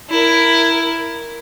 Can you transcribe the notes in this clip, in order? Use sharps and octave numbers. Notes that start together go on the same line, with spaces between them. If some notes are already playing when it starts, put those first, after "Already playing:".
E4 A#4